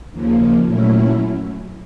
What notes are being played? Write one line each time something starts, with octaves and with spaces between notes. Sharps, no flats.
D#2 C#3 F3 A#3
A#2 F#3 A3 C#4 E4